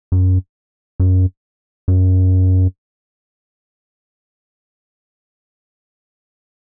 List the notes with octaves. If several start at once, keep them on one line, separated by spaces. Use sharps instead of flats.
F#2
F#2
F#2